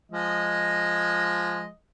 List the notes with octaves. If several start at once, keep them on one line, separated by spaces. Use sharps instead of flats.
F3 G#3 D#5